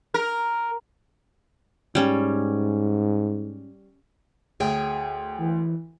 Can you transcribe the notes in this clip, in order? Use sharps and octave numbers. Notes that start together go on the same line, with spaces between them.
A#4
G#2 G3 C#4
D2 G#4 C#5 G5
E3